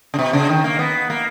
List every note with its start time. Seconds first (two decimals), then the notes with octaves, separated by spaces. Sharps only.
0.14 C#3
0.19 B2
0.33 C#3
0.49 D#3
0.64 A#3
0.79 B3
1.10 A#3